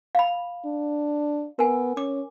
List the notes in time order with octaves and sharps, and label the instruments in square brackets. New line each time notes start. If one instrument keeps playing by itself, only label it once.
[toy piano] F5 B5
[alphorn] D4
[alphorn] B3 [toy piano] A#4 G#5
[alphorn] C#4 [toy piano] D6